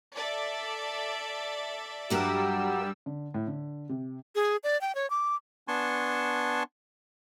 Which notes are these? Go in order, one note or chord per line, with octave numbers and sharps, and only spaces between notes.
A4 D5 E5
G2 F#3 G3 F#4 G4 A#4 E6
D3
A2
D3
C3
G#4
D5
G5
C#5
D6
B3 D4 G#5 A5 C6 C#6